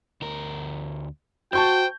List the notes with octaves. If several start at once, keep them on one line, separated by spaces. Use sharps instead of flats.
D2 A#4
F#4 C5 G5 A5 C#6 G6